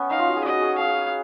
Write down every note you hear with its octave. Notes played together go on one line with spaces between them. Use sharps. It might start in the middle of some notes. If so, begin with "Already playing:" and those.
Already playing: B3 C#4
D#4 F5
F4
F#4
G#4
F#4 D#5
G#4
G#4 F5